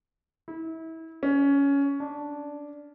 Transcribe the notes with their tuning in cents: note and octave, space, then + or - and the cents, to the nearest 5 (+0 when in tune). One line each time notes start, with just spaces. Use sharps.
E4 -30
C#4 +15
D4 -5